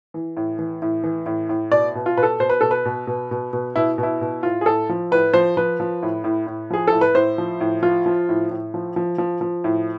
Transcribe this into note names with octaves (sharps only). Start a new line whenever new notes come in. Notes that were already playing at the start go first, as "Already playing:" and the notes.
E3
A2
E3
A2
E3
A2
A2
B2 D5
B2
F4
B2 B4
A4
B2 C5
B4
B2 A4
B4
B2
B2
B2
B2
B2 E4
B2
E4
B2
A2 F4
G#4
A2 A4
F3
A2 B4
F3 C5
F3 B4
F3
A2
A2
A2
F3 G#4
A2 A4
B4
A2 C5
F3
A2
F3 F4
F3
A2
A2
F3
F3
F3
F3
A2